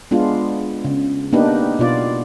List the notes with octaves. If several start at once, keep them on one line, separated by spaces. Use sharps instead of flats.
G#3 B3 D4 F4
C#3
A#3 B3 D4 D#4 G4 B4
B2 B3 F4 D5